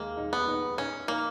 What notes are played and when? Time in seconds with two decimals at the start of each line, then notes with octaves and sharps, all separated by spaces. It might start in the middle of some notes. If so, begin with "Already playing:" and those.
Already playing: D#2 G#3 A#3
0.17 D#4
0.33 B3
0.48 D#4
0.78 C#4 D#4
1.08 A#3 D#4